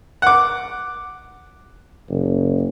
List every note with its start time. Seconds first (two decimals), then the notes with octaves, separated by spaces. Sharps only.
0.22 F#5 D6
2.09 F#1